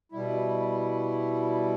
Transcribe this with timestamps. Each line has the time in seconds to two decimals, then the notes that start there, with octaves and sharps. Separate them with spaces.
0.12 B2 G3 E4